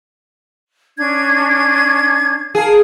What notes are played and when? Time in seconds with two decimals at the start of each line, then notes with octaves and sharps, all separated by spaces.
0.97 C#4 D4 G#6
2.55 G#4 A#4 F5 A5